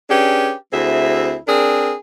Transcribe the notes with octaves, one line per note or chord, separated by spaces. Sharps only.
C#4 D4 G4 G#4 B4
D2 C4 E4 G#4 E5
C4 D4 G#4 A#4